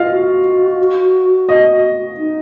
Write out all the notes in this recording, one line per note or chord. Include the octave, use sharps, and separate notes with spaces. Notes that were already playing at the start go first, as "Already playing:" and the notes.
Already playing: F4 D#5 F5
F#4
D#5
D#4